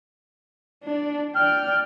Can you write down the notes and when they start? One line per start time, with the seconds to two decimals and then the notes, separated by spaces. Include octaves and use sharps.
0.84 D4 D5
1.36 D5 G5 F6